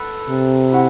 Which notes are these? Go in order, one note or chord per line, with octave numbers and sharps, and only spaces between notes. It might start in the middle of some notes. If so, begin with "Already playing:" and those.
Already playing: A4 B4
C3
E4 F#4